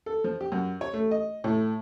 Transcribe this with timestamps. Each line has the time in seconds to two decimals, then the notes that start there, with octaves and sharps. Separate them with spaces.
0.06 A4
0.24 F3
0.41 G4
0.52 F#2
0.81 C#5
0.94 A3
1.11 D#5
1.44 A2